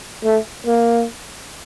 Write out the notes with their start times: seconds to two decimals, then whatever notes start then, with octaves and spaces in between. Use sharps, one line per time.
0.24 A3
0.66 A#3